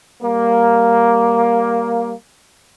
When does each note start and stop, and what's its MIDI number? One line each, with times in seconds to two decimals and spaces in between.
0.22 2.13 55
0.22 2.13 58